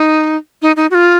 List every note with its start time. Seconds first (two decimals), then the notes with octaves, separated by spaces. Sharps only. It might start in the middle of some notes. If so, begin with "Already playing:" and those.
Already playing: D#4
0.62 D#4
0.77 D#4
0.91 F#4
0.95 F4